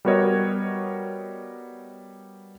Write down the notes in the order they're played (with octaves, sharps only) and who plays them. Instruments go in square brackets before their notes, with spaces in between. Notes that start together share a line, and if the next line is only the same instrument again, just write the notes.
[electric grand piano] G3 B3 F#4 A#4 C#5 D#5